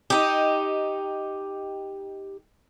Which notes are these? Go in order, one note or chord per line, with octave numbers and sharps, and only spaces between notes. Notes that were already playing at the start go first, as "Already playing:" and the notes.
D#4 G4